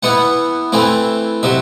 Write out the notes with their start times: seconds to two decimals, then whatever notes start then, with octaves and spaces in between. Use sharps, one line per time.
0.03 E3 B3 E4 F#5
0.72 E3 A3 C4 E4
1.43 C3 F#3 E5